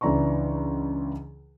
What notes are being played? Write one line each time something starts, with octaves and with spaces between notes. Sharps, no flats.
C#2 E3 D4 A#5 C6 C#6